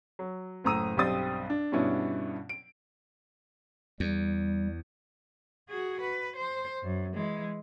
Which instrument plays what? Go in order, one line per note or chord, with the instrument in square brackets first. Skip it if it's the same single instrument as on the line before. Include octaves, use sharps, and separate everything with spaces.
[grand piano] F#3
F#1 A2 A#5 D#6 E6 D#7
B1 G2 G3 C4 D#6 A6
D4
G2 B2 B3 C#4 D4 E4
D7
[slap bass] E2 [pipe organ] G3
[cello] F#4 G#4
B4
C5
F#2
E3 G#3